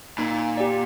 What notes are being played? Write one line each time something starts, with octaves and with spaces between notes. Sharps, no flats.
A#2 D#4
G4 D5